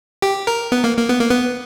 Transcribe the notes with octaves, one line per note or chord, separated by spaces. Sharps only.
G4
A#4
B3
A#3
A#3
B3
A#3
B3